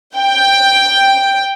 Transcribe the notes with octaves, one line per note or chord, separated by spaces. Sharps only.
G5